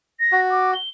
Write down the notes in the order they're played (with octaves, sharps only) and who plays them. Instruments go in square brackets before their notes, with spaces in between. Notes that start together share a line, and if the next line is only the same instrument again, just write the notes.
[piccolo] A#6
[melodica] F#4
[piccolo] D6
G7